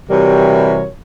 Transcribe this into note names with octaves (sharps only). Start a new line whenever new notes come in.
C3 E3 G3 F#4 A#4 C#5